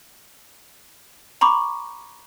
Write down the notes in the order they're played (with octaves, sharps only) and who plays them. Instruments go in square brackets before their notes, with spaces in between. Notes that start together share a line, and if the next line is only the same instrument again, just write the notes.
[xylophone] A#5 B5 C#6 D6